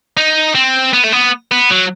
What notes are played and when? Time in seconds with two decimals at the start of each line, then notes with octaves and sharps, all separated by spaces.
0.17 D#4
0.55 C4
0.94 B3
1.04 A3
1.13 B3
1.52 B3
1.71 F#3